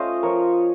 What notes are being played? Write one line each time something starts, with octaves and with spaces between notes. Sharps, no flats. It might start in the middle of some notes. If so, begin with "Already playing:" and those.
Already playing: A3 C#4 F4 C5 D#5 F5
F3 A#4 C#5